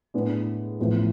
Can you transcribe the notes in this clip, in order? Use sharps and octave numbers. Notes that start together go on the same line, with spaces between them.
A2 G#3 B3 D4 G#4
A1 A2 F3 B3